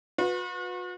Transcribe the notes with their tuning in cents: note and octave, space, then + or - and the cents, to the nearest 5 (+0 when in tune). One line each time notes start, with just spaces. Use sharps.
F#4 -45 B4 +0